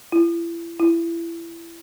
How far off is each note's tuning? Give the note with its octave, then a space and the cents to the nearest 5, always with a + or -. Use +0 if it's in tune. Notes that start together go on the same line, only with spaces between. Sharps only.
E4 +35
E4 +25